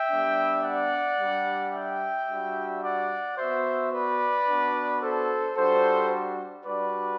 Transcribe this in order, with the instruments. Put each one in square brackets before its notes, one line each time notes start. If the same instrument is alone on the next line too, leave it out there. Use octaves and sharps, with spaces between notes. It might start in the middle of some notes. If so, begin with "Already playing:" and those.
Already playing: [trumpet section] E5 G5
G3 B3 D4
D5 F#5
G3 D4 G4
E5 G5
G3 D4 F#4
D5 F#5
B3 F#4 C5 E5
B4 D5
B3 D4 F#4
A4 C5
G3 D4 F#4 A4 C5
G3 D4 F#4 B4 D5